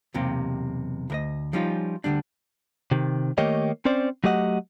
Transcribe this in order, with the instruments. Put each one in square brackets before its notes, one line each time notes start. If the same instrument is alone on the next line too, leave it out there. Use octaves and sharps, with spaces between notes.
[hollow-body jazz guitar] B1 E2 C3 A#3 G4
D2 A#4 D#5
F3 G3 C#4 D#4 F4
D2 G#2 D3 G3 D4
[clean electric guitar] C3 D#3
D#3 A3 A#3 G4 C#5 D#5
C4 C#4 C5 D5
F#3 A3 G4 D#5 F#5